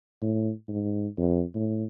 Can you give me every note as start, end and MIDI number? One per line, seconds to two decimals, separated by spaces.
0.22 0.51 45
0.68 1.07 44
1.18 1.43 41
1.55 1.85 45